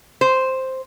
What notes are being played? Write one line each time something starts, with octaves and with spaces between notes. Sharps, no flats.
C5